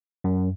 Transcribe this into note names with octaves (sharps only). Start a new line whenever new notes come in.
F#2